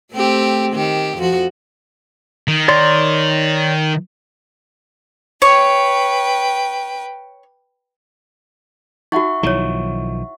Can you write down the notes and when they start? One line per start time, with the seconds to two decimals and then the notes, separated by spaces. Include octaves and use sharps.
0.12 A3 C4 G4
0.73 D#3 G4
1.17 F2 F3 F#4
2.48 D#3
2.68 C#5 D5 C6
5.42 B4 C#5 G5
9.12 D#4 F#4 E5 F#5 C#6
9.43 B1 D#3 F3 E4 C#5